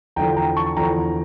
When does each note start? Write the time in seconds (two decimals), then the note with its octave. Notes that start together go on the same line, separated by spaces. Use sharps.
0.16 E2 D3 F3 G5 A#5
0.37 G5 A#5
0.56 A5 C#6
0.76 E2 D3 F3 G5 A#5